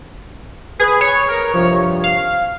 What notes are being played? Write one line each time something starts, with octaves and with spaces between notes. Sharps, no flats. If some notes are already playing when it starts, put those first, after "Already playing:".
G#4 B4
C#5
A#4
G2 C3 F3
F5